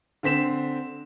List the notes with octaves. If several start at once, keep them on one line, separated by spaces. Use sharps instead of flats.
D3 C4 B6 E7